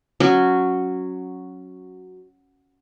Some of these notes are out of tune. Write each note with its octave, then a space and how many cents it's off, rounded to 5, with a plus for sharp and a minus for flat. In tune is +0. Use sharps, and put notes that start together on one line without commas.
F#3 -5 C#4 +0